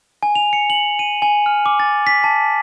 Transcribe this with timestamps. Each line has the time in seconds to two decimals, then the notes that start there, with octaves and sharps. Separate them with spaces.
0.23 G#5
0.35 F7
0.53 C#7
0.70 F#7
0.99 D#7
1.22 G#5
1.46 F6
1.66 D6
1.80 A6
2.07 B6
2.24 A5